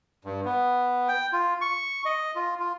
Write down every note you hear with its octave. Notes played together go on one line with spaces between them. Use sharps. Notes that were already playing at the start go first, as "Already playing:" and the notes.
G2
B3
G5
F4
C#6
D#5
F4
F4